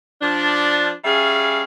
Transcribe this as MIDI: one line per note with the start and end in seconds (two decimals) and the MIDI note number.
0.22 0.90 53
0.22 0.90 62
1.05 1.62 55
1.05 1.62 61
1.05 1.62 68
1.05 1.62 76
1.05 1.62 77